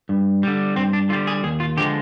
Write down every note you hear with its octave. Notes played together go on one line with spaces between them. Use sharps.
G2
D3 G3
G2 C4
D4
D3 G3 F4
G#4
D#2 G#4
F4
D3 F3 G#3 G4